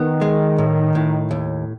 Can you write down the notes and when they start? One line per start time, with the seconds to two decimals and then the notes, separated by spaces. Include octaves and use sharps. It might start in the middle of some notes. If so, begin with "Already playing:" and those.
Already playing: D#3 B3
0.21 G#3
0.58 A2
0.95 A2
1.31 D#2